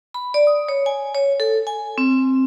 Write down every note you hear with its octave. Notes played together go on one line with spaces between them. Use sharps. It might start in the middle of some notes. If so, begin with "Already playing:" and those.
B5
D5
D#6
C#5
G#5
C#5
A4
G#5
C4